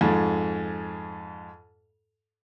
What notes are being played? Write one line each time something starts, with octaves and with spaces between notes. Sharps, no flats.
F2 G#2